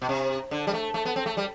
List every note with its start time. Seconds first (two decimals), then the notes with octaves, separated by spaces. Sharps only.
0.02 B2
0.09 C3
0.51 D3
0.67 G3
0.74 A3
0.94 A3
1.05 B3
1.16 C4
1.26 A3
1.37 G3